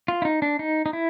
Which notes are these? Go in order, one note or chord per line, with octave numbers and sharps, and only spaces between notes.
F4
E4
D#4
D4
D#4
D#4
E4